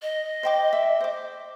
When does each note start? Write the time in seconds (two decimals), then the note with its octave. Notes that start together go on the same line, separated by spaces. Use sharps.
0.02 D#5
0.43 C5 G5 D6
0.73 E5
1.01 C5 D6